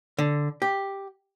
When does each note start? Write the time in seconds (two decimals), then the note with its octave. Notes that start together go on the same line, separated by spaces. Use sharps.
0.18 D3
0.62 G4